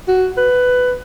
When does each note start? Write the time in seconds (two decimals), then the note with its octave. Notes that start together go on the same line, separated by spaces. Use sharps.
0.08 F#4
0.37 B4